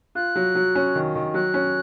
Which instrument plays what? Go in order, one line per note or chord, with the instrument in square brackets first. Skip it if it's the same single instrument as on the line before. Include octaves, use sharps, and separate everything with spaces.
[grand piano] F4 [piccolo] F#6
[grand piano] F#3
F#3
C#4
D#3
D#3
[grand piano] F#3 [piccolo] F#6
[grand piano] C#4